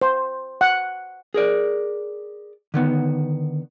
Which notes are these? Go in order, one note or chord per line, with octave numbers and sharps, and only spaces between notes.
C5
F#5
G#4 A#4 D5
D3 D#3 B3